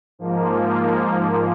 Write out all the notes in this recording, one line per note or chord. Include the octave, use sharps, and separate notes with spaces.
G#2 F3 A#3